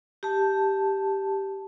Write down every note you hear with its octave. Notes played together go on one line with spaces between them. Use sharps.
G4 A5